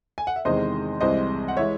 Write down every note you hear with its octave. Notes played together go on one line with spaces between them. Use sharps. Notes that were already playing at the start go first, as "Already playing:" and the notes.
G#5
F#5
E5
E2 C3 D#3 G#3 C5 D#5
C2 C3 E3 G#3 C5 D#5
F#5
E3 G#3 C#5 E5